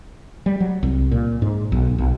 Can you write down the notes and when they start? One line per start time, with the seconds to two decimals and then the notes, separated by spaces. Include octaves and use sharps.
0.46 G3
0.60 F#3
0.83 C2
1.11 A#2
1.42 G#2
1.72 B1
1.98 B1